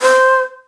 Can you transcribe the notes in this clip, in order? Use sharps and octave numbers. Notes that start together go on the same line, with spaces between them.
C5